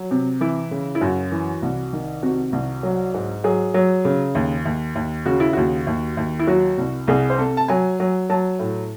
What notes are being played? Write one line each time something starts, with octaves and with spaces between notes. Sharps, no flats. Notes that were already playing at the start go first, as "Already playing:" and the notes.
Already playing: F#3
C3
E3 E4
C#3
E4
F#2 F#4
E3
C2
D#3
C3 F#4
C2
F#3
G#2
F#3 G#4
F#3
C#3
D#2
D#2
D#2
C#3 F#4
E4
D#2 F#4
D#2
D#2
E4
F#3 F#4
C2
C2 G#4
C5
C3 A4
A5
F#3 G#5
F#3
F#3 A5
A2